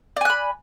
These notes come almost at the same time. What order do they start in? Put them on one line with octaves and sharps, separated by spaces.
D5 G#5 F#6 B5